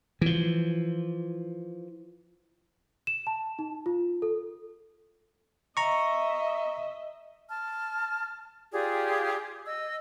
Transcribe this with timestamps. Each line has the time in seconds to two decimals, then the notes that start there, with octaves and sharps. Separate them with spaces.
0.21 E3 F3
3.07 E7
3.27 A5
3.59 D#4
3.86 F4
4.22 A4
5.77 D#5 E5 A#5 C#6
7.48 A5 F6
8.73 F4 G4 G#4 D5
9.66 D#5 E6